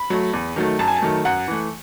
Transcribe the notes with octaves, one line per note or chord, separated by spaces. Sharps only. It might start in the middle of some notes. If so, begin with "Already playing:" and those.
Already playing: B5
F#3 A3
E2
D#3 F#3 A3
F#2 A5
G#5
A5
D#3 F#3 A3
F#2 F#5
E3 A3